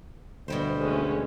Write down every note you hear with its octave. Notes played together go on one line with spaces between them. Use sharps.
D2 B2 G3 C5
G#3 A3 C#4